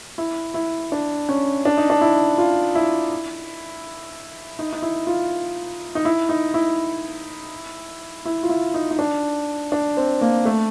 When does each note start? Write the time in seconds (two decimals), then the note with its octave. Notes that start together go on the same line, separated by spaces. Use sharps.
0.18 E4
0.54 E4
0.92 D4
1.29 C#4
1.65 D4
1.77 D#4
1.90 D4
2.01 E4
2.38 F4
2.75 E4
4.59 D#4
4.73 D#4
4.82 E4
5.07 F4
5.95 D#4
6.05 E4
6.29 D#4
6.54 E4
8.25 E4
8.43 F4
8.49 E4
8.74 D#4
8.91 D#4
8.99 D4
9.72 D4
9.97 C4
10.21 A#3
10.45 A3